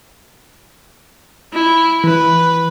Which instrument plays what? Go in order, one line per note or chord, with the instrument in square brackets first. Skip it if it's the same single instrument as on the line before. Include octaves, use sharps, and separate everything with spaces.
[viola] E4
[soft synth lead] E3 [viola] B4